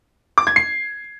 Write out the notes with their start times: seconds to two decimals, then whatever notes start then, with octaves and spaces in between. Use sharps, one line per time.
0.38 D6
0.47 G#6
0.56 C7